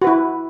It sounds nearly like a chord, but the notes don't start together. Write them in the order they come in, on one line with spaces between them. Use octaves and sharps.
F#4 B4 E4